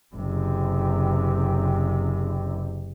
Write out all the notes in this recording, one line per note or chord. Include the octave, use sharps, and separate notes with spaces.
F#1 C3